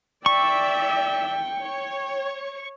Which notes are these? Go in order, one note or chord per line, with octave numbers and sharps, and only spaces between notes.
D5 E5 G5 C#6
C#5